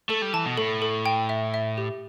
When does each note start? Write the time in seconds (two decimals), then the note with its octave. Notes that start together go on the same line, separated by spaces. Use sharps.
0.09 A3 A4
0.22 G3
0.33 E3 A5
0.46 B2
0.57 A2 A4
0.82 A4
1.06 G5
1.29 E5
1.54 E5
1.78 G4